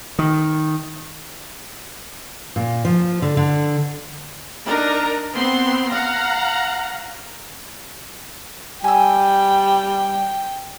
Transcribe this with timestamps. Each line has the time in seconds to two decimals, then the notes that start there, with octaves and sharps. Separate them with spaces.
0.19 D#3
2.56 A#2
2.85 F3
3.22 D3
3.37 D3
4.65 D4 D#4 A#4 A#5
5.34 B3 C4 C6
5.91 F5 F#5 A#5
8.84 G3 G5 G#5 E6